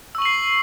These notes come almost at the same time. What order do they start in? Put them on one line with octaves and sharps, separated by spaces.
E6 C#6 F#7 C7